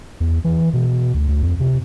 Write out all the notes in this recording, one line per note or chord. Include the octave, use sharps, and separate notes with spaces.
E2
E3
B2
D2
D2
F2
C3